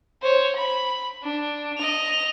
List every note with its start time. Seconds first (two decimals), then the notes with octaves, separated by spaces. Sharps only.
0.22 C5 C#5
0.56 B5
1.23 D4
1.78 D#5 F7